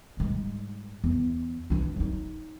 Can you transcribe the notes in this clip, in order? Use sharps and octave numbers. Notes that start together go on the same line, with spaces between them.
G#2 G3
E2
E3 D4
F#3 D#4